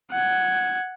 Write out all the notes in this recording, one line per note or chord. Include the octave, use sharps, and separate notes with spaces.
F#5 G#6